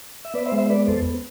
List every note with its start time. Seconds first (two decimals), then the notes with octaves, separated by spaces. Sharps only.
0.25 E5
0.34 B3 B4 D5
0.46 C5 E5
0.52 G#3
0.58 C5 E5
0.69 B3 B4 D5
0.80 B4
0.88 E2 A4 C5